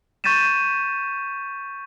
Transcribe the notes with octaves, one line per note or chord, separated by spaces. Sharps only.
C#6 G6 A6 B6 D#7 E7